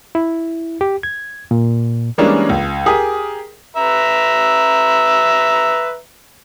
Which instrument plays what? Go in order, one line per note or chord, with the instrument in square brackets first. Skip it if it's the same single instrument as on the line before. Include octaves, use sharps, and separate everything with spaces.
[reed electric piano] E4
G4
G#6
A#2
[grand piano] E3 G3 G#3 A#3 C#4 D4
C#2
G4 G#4 A#4 D#6
[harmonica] B4 E5 A#5